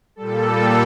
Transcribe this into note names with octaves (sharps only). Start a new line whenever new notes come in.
A#2 G3 A4